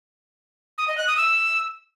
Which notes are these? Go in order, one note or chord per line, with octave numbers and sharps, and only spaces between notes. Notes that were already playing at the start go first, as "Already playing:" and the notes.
D#6
D#5
F#6
D#6
E6